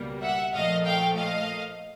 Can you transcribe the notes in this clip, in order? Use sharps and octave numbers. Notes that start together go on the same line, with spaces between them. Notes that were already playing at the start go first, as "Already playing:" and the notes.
Already playing: C#2 B2 G3 A#3
E5 F#5
A#2 F3 A3 D#5 F5
F5 G5
D#5 F5